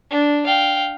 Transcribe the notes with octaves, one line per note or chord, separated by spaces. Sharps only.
D4
F5 G5